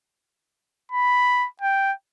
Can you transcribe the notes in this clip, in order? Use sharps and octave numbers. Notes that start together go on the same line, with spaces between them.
B5
G5